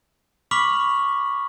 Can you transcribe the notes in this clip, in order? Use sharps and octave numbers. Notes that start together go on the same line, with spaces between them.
B5 C#6 D6 F6 B6 F#7